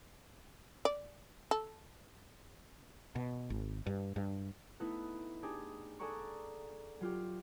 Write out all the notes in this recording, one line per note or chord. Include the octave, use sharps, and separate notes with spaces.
D5
A4
B2
G#1
G2
G2
A3 B3 D#4 E4 B4
D4 D#4 G4 G#4
G#4 A4 D5 F#5 A#5 C#6
F#3 F4 G4